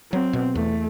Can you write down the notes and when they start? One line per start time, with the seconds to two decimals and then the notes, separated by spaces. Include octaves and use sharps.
0.12 F#3 C4
0.33 B2
0.55 E2 A3